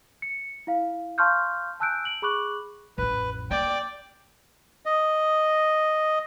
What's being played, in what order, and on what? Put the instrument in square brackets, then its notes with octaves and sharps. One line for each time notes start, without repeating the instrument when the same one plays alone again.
[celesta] C#7
E4 F5
F5 A5 C6 C#6 F6 G6
G#5 A5 E6 F#6 G6 D7
D7 F#7
G#4 B5 C#6 D6 F#6 F#7
[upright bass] A1 F2 [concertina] B4
[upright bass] A#3 [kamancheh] D5 [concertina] G5
[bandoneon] D#5